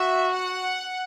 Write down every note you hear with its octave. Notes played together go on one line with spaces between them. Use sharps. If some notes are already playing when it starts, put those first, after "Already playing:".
Already playing: F#4 E5
F#5